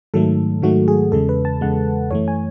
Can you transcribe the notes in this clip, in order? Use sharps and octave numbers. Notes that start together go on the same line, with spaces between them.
G#2 D#3 F#3 A3 A4
G#2 D#3 F#3 A3 F#4
G#4
E2 C#3 G#3 A4
B4
A5
E2 C#3 G#3 F#5
F#2 E3 A3 C#5
G#5